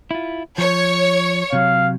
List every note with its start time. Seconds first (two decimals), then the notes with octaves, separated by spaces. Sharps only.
0.11 E4 F4
0.58 F3 C#5
1.53 C3 F#3 F5